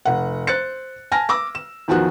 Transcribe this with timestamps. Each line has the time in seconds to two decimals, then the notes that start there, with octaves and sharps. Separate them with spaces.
0.05 F1 F#5
0.47 C5 F#6 A6 C#7
1.12 G#5 A5 F6 A#6
1.29 D6 E6 A#6
1.55 E7
1.88 E2 D#3 F3 F#4 F#6